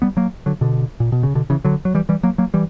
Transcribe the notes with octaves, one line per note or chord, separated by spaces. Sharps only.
G3 B3
F#3 A#3
D3 F#3
B2 D3
A#2
B2
C#3
B2 D3
C#3 E3
D3 F#3
F#3
E3 G3
E3 G3
F#3 A#3
F#3 A#3
E3 G3